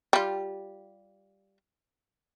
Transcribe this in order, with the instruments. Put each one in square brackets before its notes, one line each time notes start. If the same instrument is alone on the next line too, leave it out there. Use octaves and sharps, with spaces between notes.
[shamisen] G3 F4